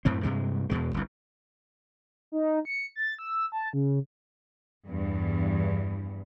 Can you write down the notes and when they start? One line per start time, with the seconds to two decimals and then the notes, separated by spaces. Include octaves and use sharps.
0.05 F#2 A2 C4
0.23 G2 C3 G#3
0.70 E2 B2 G#3
0.94 G1 C2
2.32 D#4
2.65 C#7
2.96 A6
3.19 E6
3.52 A5
3.73 C#3
4.86 E2 G2